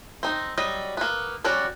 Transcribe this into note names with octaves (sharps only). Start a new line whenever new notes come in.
C4 D#4
F#3 G3 D#5
A#3 B3
G3 C#4 F#4 D5